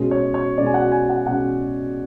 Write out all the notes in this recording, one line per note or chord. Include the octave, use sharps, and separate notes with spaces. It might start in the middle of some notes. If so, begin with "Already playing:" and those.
Already playing: B2 G#3 C#4
C#5
C#5
B2 G#3 C#4 D5
G#5
F#5
G#5
F#5
B2 G#3 C#4 F#5